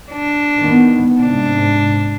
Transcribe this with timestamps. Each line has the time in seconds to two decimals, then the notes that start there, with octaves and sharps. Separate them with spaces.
0.12 D4
0.63 D#3 B3
1.21 G#2 C3 D4